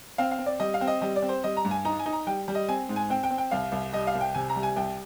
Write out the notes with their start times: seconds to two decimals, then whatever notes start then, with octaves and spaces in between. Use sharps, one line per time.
0.18 C4 F5
0.31 F5
0.39 C4
0.46 D5
0.60 G3 D#5
0.74 F5
0.81 C4
0.87 D#5
1.01 G3 D#5
1.16 D5
1.22 C4
1.29 C5
1.44 G3 D#5
1.57 A#5
1.65 G2
1.71 G#5
1.85 D#4 A#5
1.99 G#5
2.06 D#4
2.13 A#5
2.27 G3 G5
2.48 G3
2.55 D#5
2.68 C4 G#5
2.89 G#2
2.96 G#5
3.10 C4 G5
3.23 G5
3.30 C4
3.38 G5
3.51 C2 F5
3.72 C2
3.93 G3 D#5
4.07 F5
4.15 C2
4.21 G5
4.34 C3 G#5
4.49 A#5
4.56 G3
4.63 G#5
4.76 C2 G5